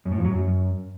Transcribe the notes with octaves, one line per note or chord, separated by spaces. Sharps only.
F#2
A2
F2
F#3
F#2